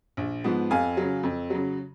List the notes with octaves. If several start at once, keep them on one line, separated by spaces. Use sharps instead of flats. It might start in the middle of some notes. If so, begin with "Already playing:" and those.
A#1
G#2 F3 B3
F2 F5 G#5
C#3 F#3
F2
C#3 F#3